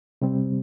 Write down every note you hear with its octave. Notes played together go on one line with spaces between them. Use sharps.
C3 G3 C4